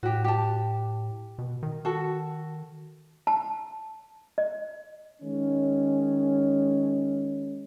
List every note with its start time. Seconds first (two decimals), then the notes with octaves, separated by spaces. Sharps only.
0.03 A2 F#4 G4
0.24 G4 A5
1.38 B2
1.63 D#3
1.85 F#4 A4
3.27 A5
4.38 D#5
5.22 D#3 G#3 C#4